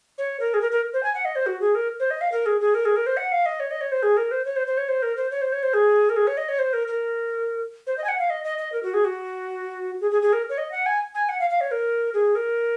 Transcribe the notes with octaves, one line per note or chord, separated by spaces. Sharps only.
C#5
A#4
G#4
A#4
A#4
C5
G#5
F#5
D#5
C5
F#4
G#4
A#4
C5
D#5
F5
A#4
G#4
G#4
A#4
G#4
A#4
C5
F#5
F5
D#5
C#5
D#5
C#5
C5
G#4
A#4
C5
C#5
C5
C5
C#5
C5
A#4
C5
C#5
C5
C#5
C5
G#4
A#4
G#4
C#5
D#5
C#5
C5
A#4
A#4
C5
D#5
G#5
F#5
F5
D#5
D#5
D#5
A#4
F#4
G#4
F#4
G#4
G#4
G#4
A#4
C#5
D#5
F#5
G#5
G#5
F#5
F5
F5
C#5
A#4
G#4
A#4